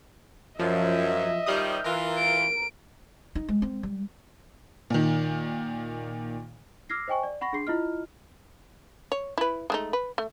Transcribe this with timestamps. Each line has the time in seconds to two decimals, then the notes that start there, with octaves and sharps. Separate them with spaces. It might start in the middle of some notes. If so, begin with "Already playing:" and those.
0.59 F#2 F3 D#5 E5
1.46 D#3 F3 G3 D#6 F6 G6
1.84 E3 F4 A#4
2.18 D7
3.35 D#4
3.49 G#3
3.62 C4
3.83 G3
4.90 A#2 D#3
6.89 D6 E6 F6 G#6 A#6 C7
7.08 C5 D#5 G5 G#5 C#6
7.23 D5
7.41 F#5 B5 C#6 A#6
7.53 D4 G#4 C6 C7
7.67 E4 F4 D#5 F6
9.12 C#5
9.38 E4 B4
9.70 G#3 A3 D#4
9.93 B4
10.18 A3